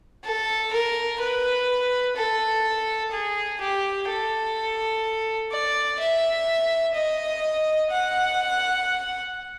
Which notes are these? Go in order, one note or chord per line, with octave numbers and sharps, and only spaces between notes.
A4
A#4
B4
A4
G#4
G4
A4
D5
E5
D#5
F#5